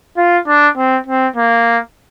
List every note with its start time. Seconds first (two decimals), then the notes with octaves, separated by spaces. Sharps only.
0.17 F4
0.47 D4
0.77 C4
1.07 C4
1.37 A#3